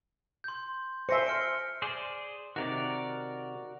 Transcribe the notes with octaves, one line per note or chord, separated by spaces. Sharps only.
C6 G6
C5 E5 G#5 A#6 C#7
F6 C#7 D7
G#4 C5 D5
C3 D#3 F#4 A#4 D5